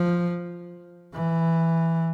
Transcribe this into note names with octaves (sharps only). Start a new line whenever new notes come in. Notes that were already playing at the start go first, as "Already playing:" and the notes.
Already playing: F3
E3